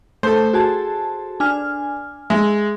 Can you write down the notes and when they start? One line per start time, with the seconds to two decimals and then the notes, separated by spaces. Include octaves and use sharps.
0.23 A3 A4 C5 G6
0.53 F#4 G#4 A5
1.40 D4 G#5 F6
2.30 G#3 E5